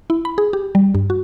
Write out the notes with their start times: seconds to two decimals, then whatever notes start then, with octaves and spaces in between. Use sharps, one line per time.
0.10 E4
0.25 B5
0.38 G#4
0.53 G4
0.75 G3
0.95 G2
1.10 F#4